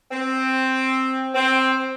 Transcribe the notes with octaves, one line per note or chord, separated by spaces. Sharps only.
C4
C4